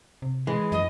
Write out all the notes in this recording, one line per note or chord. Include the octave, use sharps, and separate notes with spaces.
C3
E3 G#3
F#2 D#5